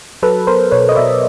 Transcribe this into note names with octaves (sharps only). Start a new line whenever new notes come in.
F#3 A4 B4
B3 A#4 C5
B2 B4 C#5
D#5
B2 D5 E5